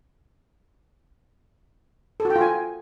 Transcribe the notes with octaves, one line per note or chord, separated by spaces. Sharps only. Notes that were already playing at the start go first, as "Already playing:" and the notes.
A4
F#4
G5
F4
G#5